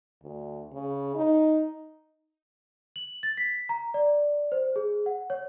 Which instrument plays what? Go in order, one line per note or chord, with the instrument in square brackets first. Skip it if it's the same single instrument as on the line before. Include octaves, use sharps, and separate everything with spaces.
[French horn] D2
C#3
D#4
[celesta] F#7
A6
B6
A#5
D5
C5
G#4
F#5
C#5